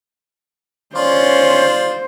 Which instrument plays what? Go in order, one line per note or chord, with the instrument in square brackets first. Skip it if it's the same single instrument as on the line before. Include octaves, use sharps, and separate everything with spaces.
[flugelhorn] C#4 [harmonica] F4 D5 [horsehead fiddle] C5 [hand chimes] C6